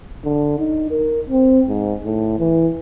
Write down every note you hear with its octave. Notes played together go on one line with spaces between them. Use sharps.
D3
D#4
A#4
C4
G#2
A2
E3